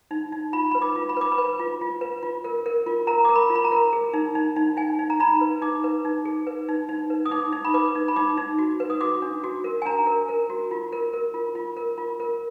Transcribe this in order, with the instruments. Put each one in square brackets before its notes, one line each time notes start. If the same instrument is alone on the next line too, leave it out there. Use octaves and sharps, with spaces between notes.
[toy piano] D#4
D#4
F4 B5
B4 B5
D6
F4
B5
B4 D6
B5
B4
F4
F4
B4
F4
A#4
A#4
F4
A#4 A#5
A#4 D6
B5
F4
B5
A#5
A#4
G#4
D#4
D#4
D#4
D#4 G#5
D#4
A#5
D#4 B5
B4
D#4 D6
B4
D#4
G#4
B4
D#4
D#4
B4
D#6
D#4 D6
D#4
B5
B4 D6
D#4
B5
D#4 D6
D#4
F#4
B4
D#6
F#4 D6
D4
F#4
A#4
G#5
D4 A#5
A#4
A#4
F#4
F4
A#4
A#4
F4
F4
A#4
F4
A#4